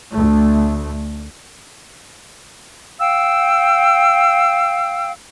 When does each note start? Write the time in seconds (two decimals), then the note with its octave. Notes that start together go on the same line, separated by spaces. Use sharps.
0.12 D2 A3
2.99 F5 G5 E6